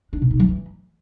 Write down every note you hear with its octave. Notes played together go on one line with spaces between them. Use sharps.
D4
B2
D#4
F#3
E3